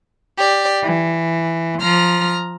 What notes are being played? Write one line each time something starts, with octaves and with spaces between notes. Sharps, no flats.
G4 D5
E3
F3 A#5 F6